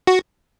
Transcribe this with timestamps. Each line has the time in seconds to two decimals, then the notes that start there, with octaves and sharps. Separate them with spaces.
0.07 F#4